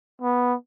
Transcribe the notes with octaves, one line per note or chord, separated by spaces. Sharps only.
B3